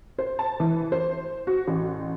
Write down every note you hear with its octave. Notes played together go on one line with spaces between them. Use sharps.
C5
A5
E3
C5
F#4
A1